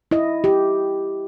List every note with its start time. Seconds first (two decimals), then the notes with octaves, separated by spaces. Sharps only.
0.11 E4 D#5
0.44 G4